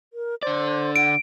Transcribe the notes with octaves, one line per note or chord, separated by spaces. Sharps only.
A#4
D3 C5 D5
F#5 D7